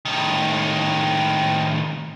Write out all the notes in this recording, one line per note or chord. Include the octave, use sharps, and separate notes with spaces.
A2 D#3